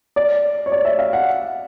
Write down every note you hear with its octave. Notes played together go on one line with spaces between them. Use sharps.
D5
C#5
D5
E5
F5
F#5